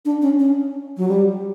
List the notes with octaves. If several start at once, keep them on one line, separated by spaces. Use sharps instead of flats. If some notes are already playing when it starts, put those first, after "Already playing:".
D4
C#4
C#4
F#3
G3